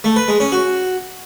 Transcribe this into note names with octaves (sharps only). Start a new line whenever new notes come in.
A3
B4
G#3
C#4
F#4